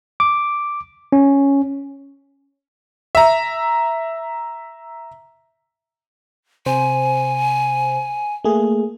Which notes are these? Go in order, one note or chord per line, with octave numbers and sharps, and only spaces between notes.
D6
C#4
E5 A#5
C3 C5 G#5
A3 A#3 G#4